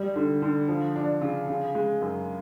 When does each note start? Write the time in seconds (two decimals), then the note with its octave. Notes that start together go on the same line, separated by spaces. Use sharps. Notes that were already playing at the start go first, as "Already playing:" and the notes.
Already playing: G3
0.16 D3
0.42 D3
0.68 F3
0.96 D4
1.21 C#3
1.48 C#3
1.75 G#3
2.01 F#2